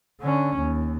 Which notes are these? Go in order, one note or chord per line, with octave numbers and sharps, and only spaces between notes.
D3 C#4
D#2